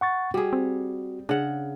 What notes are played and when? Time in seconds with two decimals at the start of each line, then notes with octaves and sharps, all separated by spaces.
0.01 F#5 C#6 A6
0.34 G3 F#4 G#4
0.53 C4
1.29 C#3 D4 F#5